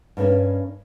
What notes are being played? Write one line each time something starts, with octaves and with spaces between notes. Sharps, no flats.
G2 A#3 C4 C#4